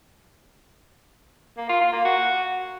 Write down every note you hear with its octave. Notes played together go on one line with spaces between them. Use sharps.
A#3
F4
F4
A#3
F#4